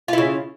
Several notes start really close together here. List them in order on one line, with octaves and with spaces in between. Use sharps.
F4 E4 C#3